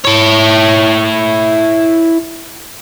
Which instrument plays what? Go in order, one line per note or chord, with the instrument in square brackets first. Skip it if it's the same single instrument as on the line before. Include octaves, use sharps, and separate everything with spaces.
[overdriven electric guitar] E4 C#5